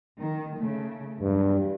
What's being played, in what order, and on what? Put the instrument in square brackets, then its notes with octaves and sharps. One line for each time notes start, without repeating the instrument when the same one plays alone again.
[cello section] D#3
C#3 A3
[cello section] E2 F#3 [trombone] G2